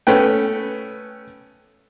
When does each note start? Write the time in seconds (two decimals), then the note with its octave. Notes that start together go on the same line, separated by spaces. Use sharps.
0.07 A3 B3 C#4 B4 G5